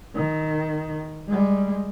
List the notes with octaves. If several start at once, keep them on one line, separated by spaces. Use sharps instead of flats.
D#3
G3 G#3